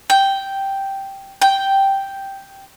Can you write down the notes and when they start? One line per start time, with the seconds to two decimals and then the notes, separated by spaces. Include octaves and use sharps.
0.10 G5
1.42 G5